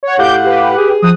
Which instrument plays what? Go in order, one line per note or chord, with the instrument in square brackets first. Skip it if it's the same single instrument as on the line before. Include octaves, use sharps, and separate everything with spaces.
[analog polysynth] C#5 F#5
[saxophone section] A2 F#5 [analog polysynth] G4 D6 G6 [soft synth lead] F5
[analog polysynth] G4 B4
[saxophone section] G#4
[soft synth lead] F3 [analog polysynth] D#6 F#6